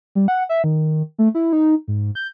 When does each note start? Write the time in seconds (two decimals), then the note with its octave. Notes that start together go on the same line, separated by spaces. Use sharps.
0.15 G3
0.28 F#5
0.49 E5
0.64 D#3
1.19 A3
1.35 E4
1.53 D#4
1.88 G#2
2.15 G6